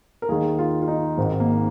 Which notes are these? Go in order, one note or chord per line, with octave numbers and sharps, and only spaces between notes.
A#4
D#2 D#3 G#4
F4
F4
D#4
G#1 G#2 D#3 C4
A#3